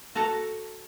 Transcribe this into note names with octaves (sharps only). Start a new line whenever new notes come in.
F#4 A4 A5 A#5